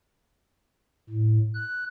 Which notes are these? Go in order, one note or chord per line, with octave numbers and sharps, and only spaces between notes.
A2
F#6